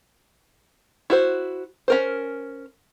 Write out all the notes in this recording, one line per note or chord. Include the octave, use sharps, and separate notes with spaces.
E4 F#4 C5
C#4 A#4 C5